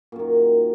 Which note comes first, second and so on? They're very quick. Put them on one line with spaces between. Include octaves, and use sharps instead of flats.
A#2 F#2 D#3